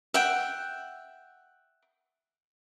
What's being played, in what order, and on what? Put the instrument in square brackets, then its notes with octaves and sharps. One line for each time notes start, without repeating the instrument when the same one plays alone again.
[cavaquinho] E5 F#5 G5